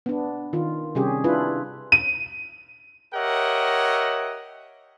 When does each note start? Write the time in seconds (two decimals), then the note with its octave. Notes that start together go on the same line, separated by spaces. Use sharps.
0.06 B3 D4
0.53 D#3 F4
0.95 C3 G3 C#4 G4 G#4
1.24 D4 E4 F4 B4
1.92 D#7
3.14 G4 A#4 C#5 D#5 E5 F#5